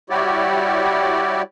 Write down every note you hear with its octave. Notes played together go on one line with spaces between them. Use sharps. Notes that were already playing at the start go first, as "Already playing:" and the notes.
G3 E4 F#4 G4 C#5 D5